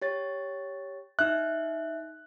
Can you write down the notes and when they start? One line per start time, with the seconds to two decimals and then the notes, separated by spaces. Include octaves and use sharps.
0.02 G4 C#5 A6
1.19 D#4 E5 F#6